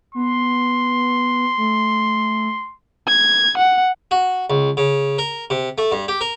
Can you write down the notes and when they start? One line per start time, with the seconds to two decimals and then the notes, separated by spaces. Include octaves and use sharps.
0.15 B3 C6
1.58 A3
3.08 G#6
3.57 F#5
4.11 F#4
4.50 C#2
4.77 C#3
5.18 A#4
5.50 C3
5.78 A3
5.92 G2
6.08 G4
6.21 A#4